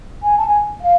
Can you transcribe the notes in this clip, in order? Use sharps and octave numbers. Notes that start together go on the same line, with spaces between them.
G#5
A5
G#5
F5